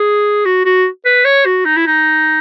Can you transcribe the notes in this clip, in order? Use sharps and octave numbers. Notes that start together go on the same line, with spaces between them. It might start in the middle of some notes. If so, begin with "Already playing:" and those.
Already playing: G#4
F#4
F#4
B4
C#5
F#4
D#4
E4
D#4